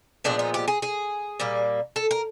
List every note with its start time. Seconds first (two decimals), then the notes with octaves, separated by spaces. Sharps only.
0.24 A#2 F3 G#3 B3 D4
0.39 D#4
0.54 G4
0.68 G#4
0.82 G#4
1.40 A#2 G3 A#3
1.96 A4
2.11 A#4